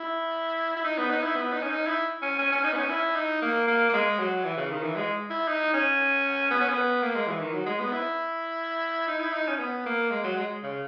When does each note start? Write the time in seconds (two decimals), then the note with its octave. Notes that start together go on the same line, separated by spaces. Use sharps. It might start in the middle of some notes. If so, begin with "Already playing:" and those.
Already playing: E4
0.76 E4
0.84 D#4
0.98 B3
1.10 D#4
1.23 E4
1.36 B3
1.53 D#4
1.62 C#4
1.71 D#4
1.87 E4
2.22 C#4
2.39 C#4
2.52 C#4
2.64 D#4
2.73 B3
2.77 C#4
2.90 E4
3.16 D#4
3.42 A#3
3.67 A#3
3.89 A#3
3.93 G#3
4.19 F#3
4.44 E3
4.57 C#3
4.71 D#3
4.83 E3
4.96 G#3
5.30 E4
5.48 D#4
5.74 C#4
6.51 B3
6.61 C#4
6.69 B3
7.02 A#3
7.15 G#3
7.27 E3
7.40 D#3
7.53 F#3
7.66 G#3
7.80 B3
7.93 E4
9.08 D#4
9.21 E4
9.34 D#4
9.47 C#4
9.59 B3
9.86 A#3
10.11 G#3
10.24 F#3
10.37 G#3
10.63 C#3